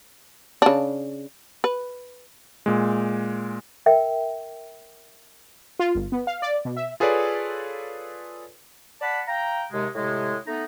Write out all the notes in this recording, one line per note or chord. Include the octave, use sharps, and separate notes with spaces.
C#3 D4
B4
A#2 G#3
A#4 E5 G5
F4
G1
B3
F5
D5
B2
E5
F4 G#4 A4 B4 C#5 D5
D5 F#5 A5 B5
F5 G5 A#5
D#2 C3 G#3
A2 C3 G#3
A3 B3 D#4 A#5